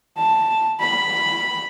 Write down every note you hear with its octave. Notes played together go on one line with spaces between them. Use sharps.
A5
B5